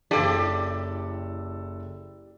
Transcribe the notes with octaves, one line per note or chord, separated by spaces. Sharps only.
F#1 E4 G4 A4 D5 A5